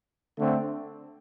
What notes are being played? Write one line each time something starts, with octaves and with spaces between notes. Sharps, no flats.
D3 A3 C4